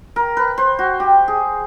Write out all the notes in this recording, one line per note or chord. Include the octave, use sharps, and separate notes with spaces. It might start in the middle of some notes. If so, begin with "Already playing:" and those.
A#4
B4
C5
F#4
G4
G#4